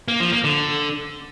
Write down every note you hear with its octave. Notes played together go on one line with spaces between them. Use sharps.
A#3
F3
A#3
D3